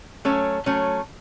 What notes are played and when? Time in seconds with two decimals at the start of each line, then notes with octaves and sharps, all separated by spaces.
0.25 F#3 A3 C#4
0.66 F#3 A3 C#4